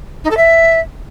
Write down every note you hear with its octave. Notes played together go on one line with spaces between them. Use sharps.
D#4
A4
E5